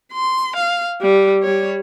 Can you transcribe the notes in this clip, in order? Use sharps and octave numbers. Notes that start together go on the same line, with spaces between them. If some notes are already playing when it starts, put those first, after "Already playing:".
C6
F5
G3
G3 C#5